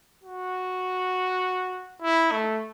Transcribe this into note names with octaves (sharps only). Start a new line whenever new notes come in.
F#4
E4
A3